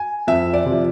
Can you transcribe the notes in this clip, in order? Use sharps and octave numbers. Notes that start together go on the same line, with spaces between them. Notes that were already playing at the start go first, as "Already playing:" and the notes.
Already playing: G#5
F2 E5
D5
C3 F3